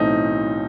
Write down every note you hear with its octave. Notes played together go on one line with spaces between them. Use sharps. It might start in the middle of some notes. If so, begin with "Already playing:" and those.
Already playing: B1 A2 E3 A3 C4 D#4